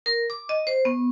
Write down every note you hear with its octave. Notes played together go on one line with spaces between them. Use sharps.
A#4
D6
D#5
C5
B3